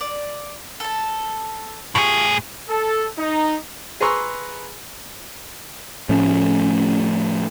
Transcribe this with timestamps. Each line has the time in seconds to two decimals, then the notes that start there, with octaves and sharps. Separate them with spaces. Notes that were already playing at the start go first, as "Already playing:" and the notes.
0.01 D5
0.80 A4 A5
1.95 A2 F4 G4 G#4 C#6
2.69 A4
3.19 D#4
4.00 G#4 B4 A#5 C6 C#6 E6
6.09 A2 F3 A3 C#4